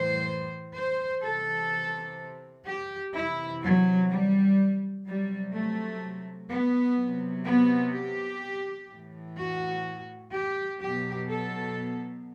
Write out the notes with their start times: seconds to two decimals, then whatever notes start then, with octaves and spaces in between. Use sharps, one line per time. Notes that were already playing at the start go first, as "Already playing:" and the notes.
Already playing: A2 E3 C5
0.76 C5
1.24 C3 E3 A4
2.67 G4
3.16 C3 E3 E4
3.63 F#3
4.11 G3
5.07 C3 F#3 G3
5.54 A3
6.51 B3
6.98 C3 F#3
7.46 B3
7.94 G4
8.91 A2 E3
9.38 F#4
10.34 G4
10.81 B2 F#3 G4
11.30 A4